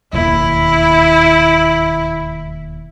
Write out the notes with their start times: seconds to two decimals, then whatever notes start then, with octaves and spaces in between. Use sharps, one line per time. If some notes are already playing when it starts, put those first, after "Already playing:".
0.13 E1 D#2 E4